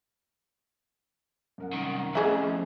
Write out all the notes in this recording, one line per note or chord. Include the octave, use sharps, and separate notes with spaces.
F#2 A#4 F#5
C2 D#3
F2 A3 B3 C#4 E4 G#4 E5